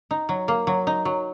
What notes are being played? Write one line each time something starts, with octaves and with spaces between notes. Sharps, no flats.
D#4
F#3
A#3
F#3
D#4
F#3